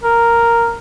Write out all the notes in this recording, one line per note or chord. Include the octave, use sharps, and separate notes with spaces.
A#4